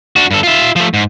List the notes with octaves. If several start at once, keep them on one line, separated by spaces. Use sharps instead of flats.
D4 F#4
G2 A4
F4 E5
F3 A3
G#2